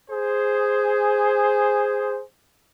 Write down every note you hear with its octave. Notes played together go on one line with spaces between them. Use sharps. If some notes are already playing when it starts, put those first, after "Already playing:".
G#4 C5